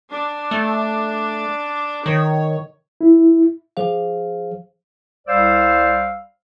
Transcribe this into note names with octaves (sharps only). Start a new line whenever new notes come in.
D4
A3
D#3 C#5
E4
F3 G#4 C5 F5
C2 G3 C5 D5 F5 E6